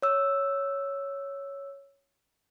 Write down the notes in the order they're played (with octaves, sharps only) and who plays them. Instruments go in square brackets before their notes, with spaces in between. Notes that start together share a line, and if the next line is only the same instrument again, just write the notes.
[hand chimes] C#5 E6